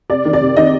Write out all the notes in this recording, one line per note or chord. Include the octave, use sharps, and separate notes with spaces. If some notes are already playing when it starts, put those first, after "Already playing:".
C3 D5
D#3
D5
C3
D#3 D#5